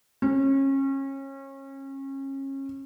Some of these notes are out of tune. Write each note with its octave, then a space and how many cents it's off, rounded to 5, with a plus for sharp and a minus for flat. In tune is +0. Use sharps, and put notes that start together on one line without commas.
C#4 -30